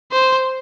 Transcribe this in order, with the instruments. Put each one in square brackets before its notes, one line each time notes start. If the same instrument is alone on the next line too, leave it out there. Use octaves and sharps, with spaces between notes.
[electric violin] C5